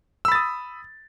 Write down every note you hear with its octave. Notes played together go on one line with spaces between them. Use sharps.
B5 D#6 E6 A6